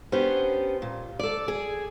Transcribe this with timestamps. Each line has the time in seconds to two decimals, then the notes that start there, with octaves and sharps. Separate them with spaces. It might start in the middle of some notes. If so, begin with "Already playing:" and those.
0.12 B3 C#4 D4 G4 C5
0.82 A#2
1.19 A4 D5
1.48 G#4